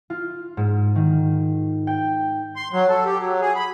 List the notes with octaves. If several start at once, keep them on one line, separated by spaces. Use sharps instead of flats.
F4
G#2
D#3
G5
C6
F#3
A4
G4
F#3
G#4
B5